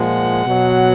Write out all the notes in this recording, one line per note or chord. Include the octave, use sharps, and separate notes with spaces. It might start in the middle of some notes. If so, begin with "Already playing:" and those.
Already playing: A#2 F3 G#3 F#5
B2 F#3